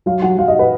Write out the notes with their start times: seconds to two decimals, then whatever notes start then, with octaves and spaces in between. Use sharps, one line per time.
0.06 F#3 F5
0.22 F#3 F#5
0.37 F#3 F5
0.48 D#5
0.59 B4